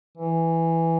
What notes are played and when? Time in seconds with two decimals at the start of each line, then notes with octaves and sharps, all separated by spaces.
0.18 E3